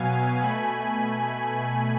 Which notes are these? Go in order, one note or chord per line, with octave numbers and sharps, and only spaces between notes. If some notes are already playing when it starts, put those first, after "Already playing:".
Already playing: B2 F#3 B3 F5 G#5
B2 A3 G#5 B5